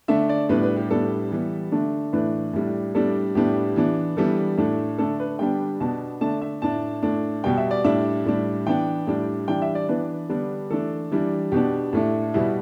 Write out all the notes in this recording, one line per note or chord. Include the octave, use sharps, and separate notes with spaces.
D3 A3 D4 E5
D5
A2 G3 B3 D4 B4
B4
G4
A2 G3 B3 D4 A4
E3 G3 B3
D3 A3 D4
A2 E3 A3 D4 B4
A2 G3 D4
A2 G3 B3 D4 A4
A2 G3 B3 D4 G4
E3 B3 D4
E3 G3 B3 D4 A4
A2 A3 D4
D3 A3 D4 A4
B4
D3 G3 B3 D4 G5
B2 B3 D4 A5
D3 A3 D4 A5
E5
A2 A3 D4 A5
A2 A3 D4
B2 G3 B3 G5
E5
D5
A2 G3 D4 E5
A2 G3 D4
E3 B3 D4 G5
A2 G3 D4
E3 G3 D4 G5
E5
D5
E3 B3 D4 B4
D3 G3 B3 D4
E3 A3 D4 A4
E3 G3 D4
B2 B3 D4 G4
A2 A3 D4
B2 G3 B3 E4